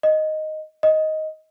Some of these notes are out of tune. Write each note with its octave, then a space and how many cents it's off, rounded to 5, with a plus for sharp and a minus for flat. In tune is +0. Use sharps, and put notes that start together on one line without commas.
D#5 +0
D#5 +10